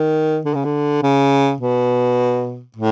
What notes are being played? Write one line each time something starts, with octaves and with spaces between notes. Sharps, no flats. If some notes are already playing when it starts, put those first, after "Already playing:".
Already playing: D#3
D3
C#3
D3
C#3
B2
A2